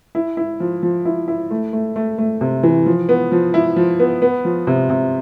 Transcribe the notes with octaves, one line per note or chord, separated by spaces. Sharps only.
E4
E4
F3
F3
E4
E4
A3
A3
A3
A3
C3
E3
F3
B3
F3
E4
F3
B3
B3
F3
C3
C3